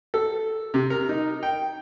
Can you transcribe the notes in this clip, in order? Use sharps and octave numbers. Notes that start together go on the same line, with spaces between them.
A4
C3
A#4
D#4
G5